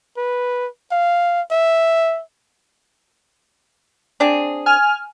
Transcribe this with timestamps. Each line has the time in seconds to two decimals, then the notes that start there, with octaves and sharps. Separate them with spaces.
0.17 B4
0.91 F5
1.51 E5
4.20 C4 D4 G#4
4.66 G#5 F6